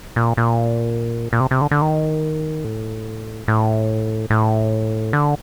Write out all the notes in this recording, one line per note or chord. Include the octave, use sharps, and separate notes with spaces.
A#2
A#2
A#2
C3
C3
D3
D3
D#3
A2
A2
A2
D3